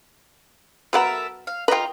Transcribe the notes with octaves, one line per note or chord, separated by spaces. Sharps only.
F#3 B3 A4 A#4 E5 F#5
F5
F4 B4 D#5 G5 A#5